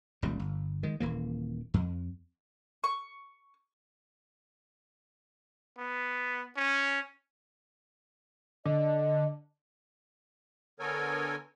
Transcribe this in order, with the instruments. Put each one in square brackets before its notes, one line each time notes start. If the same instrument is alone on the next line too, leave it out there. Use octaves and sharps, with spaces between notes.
[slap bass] D#1 C#2 G3
G1
D#3 G#3
D#1 E3 A#3
F2
[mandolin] C#6
[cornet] B3
C#4
[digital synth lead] D3 [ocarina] D#5
[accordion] D3 B3 A4 A#4 C#5 G#5